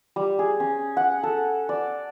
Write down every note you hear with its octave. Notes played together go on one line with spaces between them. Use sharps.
G3
G#4
C#4
F#5
A4
D5